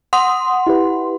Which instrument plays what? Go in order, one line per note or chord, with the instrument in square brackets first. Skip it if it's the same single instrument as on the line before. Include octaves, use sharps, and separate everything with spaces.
[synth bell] F#5 C6 [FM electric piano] D#6
[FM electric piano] E4 G4 B4